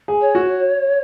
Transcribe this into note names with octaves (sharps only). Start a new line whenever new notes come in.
G#4
C#5
F#4